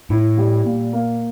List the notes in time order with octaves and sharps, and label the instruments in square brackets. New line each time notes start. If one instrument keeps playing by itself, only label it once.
[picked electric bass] A2 [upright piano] E4
[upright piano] G3
A#2
A#3